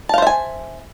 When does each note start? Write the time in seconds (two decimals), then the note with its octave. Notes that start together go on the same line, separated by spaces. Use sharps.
0.09 A5
0.14 F5
0.18 C5
0.22 E5
0.27 G#5